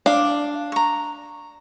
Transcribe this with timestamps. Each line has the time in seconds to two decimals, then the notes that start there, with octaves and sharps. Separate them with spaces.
0.06 D4 F5 D6
0.72 A#5 C#6